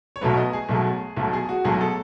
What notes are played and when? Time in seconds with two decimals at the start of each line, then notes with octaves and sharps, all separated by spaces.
0.16 C#5
0.21 B1 B2 F#3 A3 B4
0.37 D#5
0.53 G#4
0.69 B1 B2 F#3 A3
1.17 B1 B2 F#3 A3
1.33 G#4
1.49 F#4
1.64 B1 B2 F#3 A3 G#4
1.81 A4